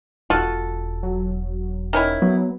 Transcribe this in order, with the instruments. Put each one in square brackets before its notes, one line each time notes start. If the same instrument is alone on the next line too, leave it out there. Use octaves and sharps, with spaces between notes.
[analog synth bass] E1 [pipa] F4 F#4 A4
[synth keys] F#3
[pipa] D#3 C#4 E4
[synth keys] F#3 [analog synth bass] B3